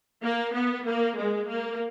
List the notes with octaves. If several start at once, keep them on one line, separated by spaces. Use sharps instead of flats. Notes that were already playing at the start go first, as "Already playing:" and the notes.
A#3
B3
A#3
G#3
A#3